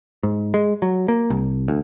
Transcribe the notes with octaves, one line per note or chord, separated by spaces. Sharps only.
G#2
G#3
F#3
A#3
C2
D2